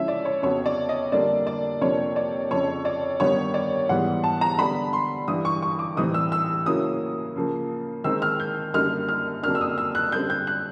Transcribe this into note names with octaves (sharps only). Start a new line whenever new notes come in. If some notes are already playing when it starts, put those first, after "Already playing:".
Already playing: C#3 F3 G#3 C#4 E4 E5
D5
C#5
F2 C#3 F#3 B3 C#5
D5
D#5
F2 D3 G3 A#3 D4 D5
D5
F2 C3 F3 A#3 D4 C#5
D5
F2 C#3 F3 C#5
D5
G2 D#3 G3 B3 C#5
D5
G#2 E3 G3 B3 F#5
A5
A#5
D3 G3 B3 D4 B5
C6
G2 E3 G3 D#6
C#6
C#6
D6
A2 E3 G3 C4 D#4 D#6
E6
E6
C#3 F#3 A#3 C#4 E4 D#6
C#3 F3 A#3
D#3 G#3 C4 D#4 E6
F6
G6
F#2 D3 G3 A#3 D#4 F6
F6
F2 C#3 F#3 A#3 D4 F6
E6
D#6
E6
F#6
F#2 D3 G3 C4 G6
G6
F#6